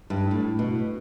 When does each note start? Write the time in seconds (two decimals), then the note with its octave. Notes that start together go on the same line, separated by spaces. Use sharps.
0.10 G2
0.31 A2
0.59 B2